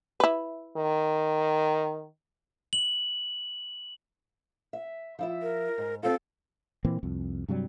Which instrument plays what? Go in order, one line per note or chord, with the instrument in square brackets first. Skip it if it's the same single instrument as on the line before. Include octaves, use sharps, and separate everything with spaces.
[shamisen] E4 B4
[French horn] D#3
[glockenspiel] F#7
[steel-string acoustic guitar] E5
F3 E4 E5
[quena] A#4
[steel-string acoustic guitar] G#2
[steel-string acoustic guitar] C4 F4 [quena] A4
[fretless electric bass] A#2 E3 A#3 C4
C2 F2
G2 C3 F#3 G3